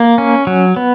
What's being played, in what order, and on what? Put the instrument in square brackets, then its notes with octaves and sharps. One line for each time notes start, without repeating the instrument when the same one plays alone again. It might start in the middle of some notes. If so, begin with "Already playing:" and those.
Already playing: [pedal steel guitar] A#3
C#4
F#3
B3